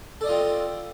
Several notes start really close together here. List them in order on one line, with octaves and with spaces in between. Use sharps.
A4 D5 D#5 F4 C4